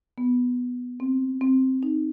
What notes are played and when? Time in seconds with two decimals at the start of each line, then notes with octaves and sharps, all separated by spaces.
0.18 B3
1.00 C4
1.41 C4
1.83 D#4